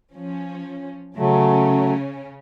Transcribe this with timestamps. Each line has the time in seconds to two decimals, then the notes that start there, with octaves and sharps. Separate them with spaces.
0.15 F3 C#4
1.17 C#3 F#3 A3 C#4